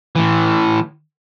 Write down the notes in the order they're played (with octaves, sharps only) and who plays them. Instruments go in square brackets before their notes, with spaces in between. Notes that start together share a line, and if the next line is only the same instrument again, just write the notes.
[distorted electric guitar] A2 E3